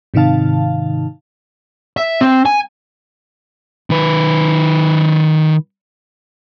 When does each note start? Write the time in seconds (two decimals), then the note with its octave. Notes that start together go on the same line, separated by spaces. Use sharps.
0.14 G#2 C3 D#3 D#4 F5 A5
1.97 E5
2.21 C4
2.46 G#5
3.90 D#3 B4